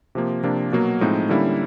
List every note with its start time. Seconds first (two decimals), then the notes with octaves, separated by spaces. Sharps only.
0.15 C3 F3 A#3
0.43 C3 F3 A#3 D4
0.72 B2 F#3 A#3
1.01 A2 F3 G#3 C4 D#4
1.30 D3 G3 A#3 C#4 E4